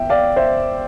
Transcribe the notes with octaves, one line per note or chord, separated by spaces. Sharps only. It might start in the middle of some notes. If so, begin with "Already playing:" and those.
Already playing: E5 G5
D5 F5
C5 E5